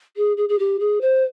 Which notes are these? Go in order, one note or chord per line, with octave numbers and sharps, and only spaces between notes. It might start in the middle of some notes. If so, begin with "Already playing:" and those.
G#4
G#4
G#4
G4
G#4
C5